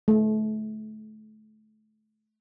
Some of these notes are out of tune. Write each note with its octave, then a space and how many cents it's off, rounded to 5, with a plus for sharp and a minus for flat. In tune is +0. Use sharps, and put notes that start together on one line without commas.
A3 -30